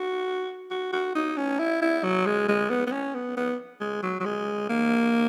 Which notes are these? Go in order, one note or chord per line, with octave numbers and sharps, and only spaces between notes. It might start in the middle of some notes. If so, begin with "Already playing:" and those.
Already playing: F#4
F#4
F#4
D#4
C#4
E4
E4
F#3
G#3
G#3
B3
B3
C#4
B3
B3
G#3
F#3
F#3
G#3
A#3